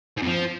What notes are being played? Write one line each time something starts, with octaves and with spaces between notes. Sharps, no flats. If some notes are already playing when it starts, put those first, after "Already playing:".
G#2
F2
F3